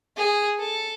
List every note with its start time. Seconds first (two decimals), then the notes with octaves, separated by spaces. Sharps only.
0.17 G#4
0.59 A4